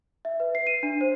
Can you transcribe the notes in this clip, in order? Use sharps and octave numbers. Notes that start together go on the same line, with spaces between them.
E5
B4
C7
D#7
D4
C5